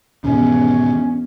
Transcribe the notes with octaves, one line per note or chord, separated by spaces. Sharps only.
E2 G#2 B2 D#3 C#4